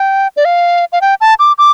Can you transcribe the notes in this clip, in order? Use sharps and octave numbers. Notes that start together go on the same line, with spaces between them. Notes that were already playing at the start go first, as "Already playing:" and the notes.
Already playing: G5
D5
F5
F5
G5
A5
D6
D6